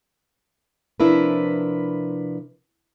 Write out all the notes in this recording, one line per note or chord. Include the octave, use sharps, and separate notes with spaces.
C3 F3 D4 E4 A#4 B4